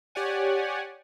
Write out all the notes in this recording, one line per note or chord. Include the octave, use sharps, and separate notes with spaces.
G4 C#5 D5 F#5 G#5